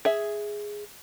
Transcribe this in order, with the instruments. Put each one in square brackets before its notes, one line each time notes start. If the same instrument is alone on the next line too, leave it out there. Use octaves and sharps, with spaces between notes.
[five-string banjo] G#4 E5